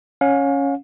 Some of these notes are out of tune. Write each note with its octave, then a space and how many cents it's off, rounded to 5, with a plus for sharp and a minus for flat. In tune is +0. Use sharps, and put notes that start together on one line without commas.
C#4 +0 F5 +40